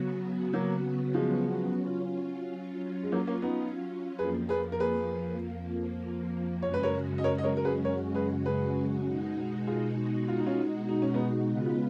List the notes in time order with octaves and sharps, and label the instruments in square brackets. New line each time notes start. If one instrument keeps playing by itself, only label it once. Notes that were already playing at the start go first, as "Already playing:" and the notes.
Already playing: [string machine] C#3 F#3 B3 F#4
[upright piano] F#3 A#3
F3 G#3
[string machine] F#3 C#4 F4
[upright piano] G#3
F#3 A#3
A#3 C#4
B3 D#4
[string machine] F2 F3 A#3 [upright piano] G#4 B4
[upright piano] G#4 B4
A#4
G#4 B4
[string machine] F#2 C#3 G#3 C#4 F#4 [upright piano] C#5
[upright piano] B4
A#4 C#5
D#5
A#4 C#5
D#5
A#4 C#5
A#4
G#4 B4
A#4 C#5
G#4 B4
G#4 B4
[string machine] B2 G#3 D#4 F#4
[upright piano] F4 G#4
F4
D#4
C#4 F4
D#4
C#4
B3 D#4
[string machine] C#3 G#3 B3 F4 B4